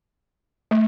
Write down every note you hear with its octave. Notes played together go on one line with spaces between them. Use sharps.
A3